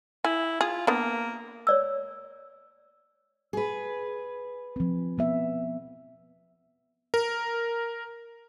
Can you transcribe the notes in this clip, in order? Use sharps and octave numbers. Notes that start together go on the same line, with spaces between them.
E4 G#5
F4 G#4
A#3 B3 D4
C#5 D5 E6
G#4 B4
F3 C4
F3 B3 E5
A#4